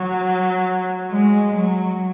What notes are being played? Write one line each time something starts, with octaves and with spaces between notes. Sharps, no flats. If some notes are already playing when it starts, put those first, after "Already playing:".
Already playing: F#3
G#3
F#3